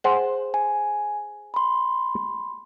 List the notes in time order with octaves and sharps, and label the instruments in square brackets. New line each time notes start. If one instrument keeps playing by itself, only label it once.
[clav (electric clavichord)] G#4 C5 F#5
[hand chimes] G#5
B5 C6